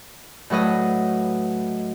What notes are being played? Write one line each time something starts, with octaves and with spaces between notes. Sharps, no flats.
A2 F#3 B4 D#5